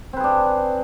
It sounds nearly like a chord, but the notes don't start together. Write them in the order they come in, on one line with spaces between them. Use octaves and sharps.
C4 B4 G#4 D4